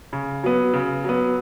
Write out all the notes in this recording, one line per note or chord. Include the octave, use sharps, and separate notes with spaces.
C#3
F#3 B3
C#3
F#3 B3